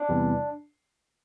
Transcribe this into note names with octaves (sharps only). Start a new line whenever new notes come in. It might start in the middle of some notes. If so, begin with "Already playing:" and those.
Already playing: D4
E2 C3 E3 G3